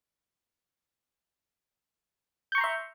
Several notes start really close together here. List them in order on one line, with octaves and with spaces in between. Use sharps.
G6 C#6 A#5 C6 E5